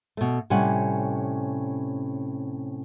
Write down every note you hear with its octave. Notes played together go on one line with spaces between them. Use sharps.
B2 A3
A2 C3 G3 C#4 F#5 G#5